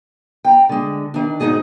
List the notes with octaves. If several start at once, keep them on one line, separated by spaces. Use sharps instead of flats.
G5 A#5
D3 G#3
D#3 D4
D2 G#2 G#3 D#4 G#4 D#5